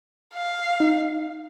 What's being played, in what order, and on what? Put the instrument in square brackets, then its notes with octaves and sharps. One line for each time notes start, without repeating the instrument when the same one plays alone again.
[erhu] F5
[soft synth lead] D#4